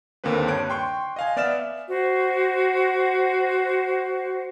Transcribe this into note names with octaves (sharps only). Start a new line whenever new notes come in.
D#2 D3 A#3 C4 B4
G2 C#5 F#6 D7
G5 C6 C#6
D#5 F5 G#5
B3 D5 E5 F6 E7
F#4 C5